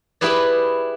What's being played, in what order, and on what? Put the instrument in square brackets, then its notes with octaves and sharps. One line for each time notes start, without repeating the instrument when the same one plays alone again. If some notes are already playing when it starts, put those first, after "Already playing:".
[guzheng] E4 G4 G#4 B4 D5